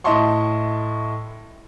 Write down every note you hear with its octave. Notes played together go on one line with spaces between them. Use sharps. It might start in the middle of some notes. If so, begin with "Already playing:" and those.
A2 D#5 E5 A5 C6 C#6